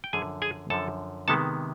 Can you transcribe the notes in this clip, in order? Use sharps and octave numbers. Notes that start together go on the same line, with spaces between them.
G5
F#2 D3 F3 G#4 G#5
G#4 G#5
F#2 D3 F3 A4 A5
C3 D#3 G#3 B3 A4 A5